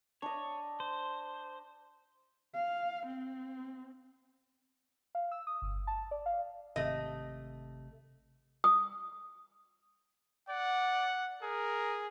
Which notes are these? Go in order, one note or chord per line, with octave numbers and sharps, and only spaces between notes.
D4 C#5 D#5
C5
F5
C4
F5
E6
D#6
G1
A5
D5
F5
G#1 C3 A3 D#5
D#6
D5 F#5
G#4 A#4